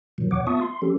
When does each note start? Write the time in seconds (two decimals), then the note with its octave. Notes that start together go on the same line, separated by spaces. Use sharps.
0.18 G2 A#2 D#3 F3 F#3
0.31 E2 A#2 C#5 F#5 D6
0.47 B3 F4 E5 A5 C#6 D#6
0.61 C6
0.82 F3 C#4 G4 A4